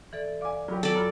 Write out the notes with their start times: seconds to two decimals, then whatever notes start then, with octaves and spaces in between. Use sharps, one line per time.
0.13 E3 A4 D5
0.41 D5 F5 G#5 D6
0.68 F#3 F4 G4 B5
0.83 A4 D5
0.95 F#2 F4 B5